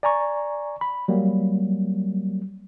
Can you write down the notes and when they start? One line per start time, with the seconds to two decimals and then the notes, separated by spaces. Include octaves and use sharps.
0.03 D5 G#5 A#5 C#6
0.81 B5
1.08 F#3 G3 A#3